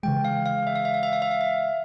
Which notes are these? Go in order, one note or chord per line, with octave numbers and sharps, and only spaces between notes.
C#3 E3 G#3 G5
F5
F5
E5
F5
E5
F5
E5
F5
E5
F5
E5